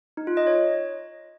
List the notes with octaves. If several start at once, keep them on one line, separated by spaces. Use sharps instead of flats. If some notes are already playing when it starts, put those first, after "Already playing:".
D#4
F4
D#5
C#5